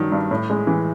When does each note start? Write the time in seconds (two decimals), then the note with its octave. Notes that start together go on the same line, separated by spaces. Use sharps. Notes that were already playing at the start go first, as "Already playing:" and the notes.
Already playing: G2 D#3 F#3
0.12 G2
0.31 A2
0.50 G#3
0.67 E3